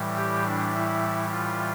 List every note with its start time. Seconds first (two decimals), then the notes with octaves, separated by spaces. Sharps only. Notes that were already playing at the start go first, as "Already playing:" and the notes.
Already playing: A2 E3 G3
0.17 G4
0.46 D4
0.74 E4
1.31 F4